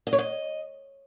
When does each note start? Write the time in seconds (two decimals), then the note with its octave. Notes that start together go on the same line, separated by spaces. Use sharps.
0.07 D#5
0.13 C#5
0.19 D#5